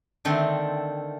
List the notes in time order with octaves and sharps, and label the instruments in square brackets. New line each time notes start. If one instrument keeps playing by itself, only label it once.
[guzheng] D3 D#3 A3 C4